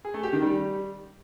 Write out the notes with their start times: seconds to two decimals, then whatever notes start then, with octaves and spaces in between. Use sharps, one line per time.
0.05 G#4
0.14 A3
0.23 G4
0.33 D#3
0.42 G3